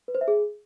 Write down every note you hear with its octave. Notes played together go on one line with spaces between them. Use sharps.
B4
C5
E5
G#4